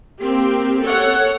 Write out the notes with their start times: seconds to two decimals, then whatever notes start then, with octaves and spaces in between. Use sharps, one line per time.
0.20 A#3 C4 G4
0.81 A4 C#5 F#5